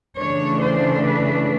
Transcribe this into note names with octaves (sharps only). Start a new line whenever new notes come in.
C#3 E3 A3 D4 C#5
C5
B4